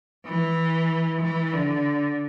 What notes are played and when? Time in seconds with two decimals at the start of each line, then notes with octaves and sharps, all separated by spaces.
0.25 E3
1.22 E3
1.53 D3